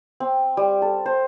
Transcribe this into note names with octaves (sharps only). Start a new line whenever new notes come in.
C4
G3
A4
C5